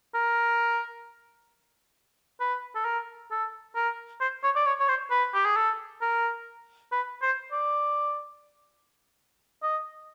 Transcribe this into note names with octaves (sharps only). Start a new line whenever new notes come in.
A#4
B4
A4
A#4
A4
A#4
C5
C#5
D5
C#5
C#5
C5
B4
G4
G#4
A4
A#4
B4
C5
D5
D#5